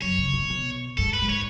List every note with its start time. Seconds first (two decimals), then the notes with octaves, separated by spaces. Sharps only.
0.02 F#2 C#5
0.18 C#3
0.34 B2
0.50 B2
0.98 G#2 A4
1.13 B4
1.22 G#2
1.29 C#5